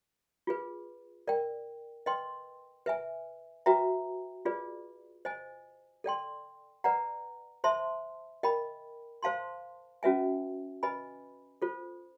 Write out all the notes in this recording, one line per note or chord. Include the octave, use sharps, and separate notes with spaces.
F4 G#4 B4
A#4 D5 G5
B4 D#5 G5 C6
B4 E5 G#5
F#4 B4 E5 G5 A#5
F4 G#4 B4 D5
C5 D#5 G#5
A4 D5 G5 C6
B4 D5 F#5 A#5
C5 E5 A5 C6
A#4 D#5 G5 B5
C5 F5 A5 C6
C#4 F#4 B4 E5 G#5
B4 D#5 G#5 B5
F4 A4 C5